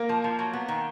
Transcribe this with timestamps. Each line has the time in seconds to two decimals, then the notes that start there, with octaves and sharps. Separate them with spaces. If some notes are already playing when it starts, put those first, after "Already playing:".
Already playing: A#3 A#4
0.09 F3
0.24 F3
0.39 F#3
0.53 B3
0.68 D#3